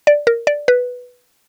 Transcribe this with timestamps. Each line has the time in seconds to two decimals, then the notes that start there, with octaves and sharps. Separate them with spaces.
0.07 D5
0.27 A#4
0.47 D5
0.68 B4